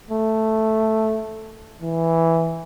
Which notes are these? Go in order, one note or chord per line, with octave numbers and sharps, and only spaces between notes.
A3
E3